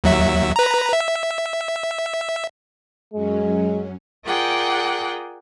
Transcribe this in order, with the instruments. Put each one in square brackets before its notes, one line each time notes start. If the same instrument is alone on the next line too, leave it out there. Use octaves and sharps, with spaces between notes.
[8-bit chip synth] D#2 F#3 E5
B4 A#5
E5
[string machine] F#2 F#3 C#4 [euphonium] G#3
[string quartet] F4 G#4 A#4 D5 F#5 G5